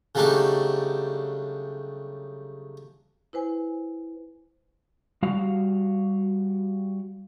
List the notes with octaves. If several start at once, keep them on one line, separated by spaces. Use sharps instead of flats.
C#3 F#3 G3 A3 D4 D#4
E4 B4 C5 G#5
G3 F#4 F5